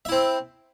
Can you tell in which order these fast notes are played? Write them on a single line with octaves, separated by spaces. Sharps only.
E5 E4 C4